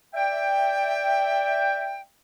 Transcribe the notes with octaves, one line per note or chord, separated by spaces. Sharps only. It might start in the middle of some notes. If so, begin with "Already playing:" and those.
D5 E5 G5